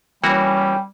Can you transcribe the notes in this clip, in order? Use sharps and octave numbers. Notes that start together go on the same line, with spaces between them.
E3 G3 A#3 C#4 F#4 G5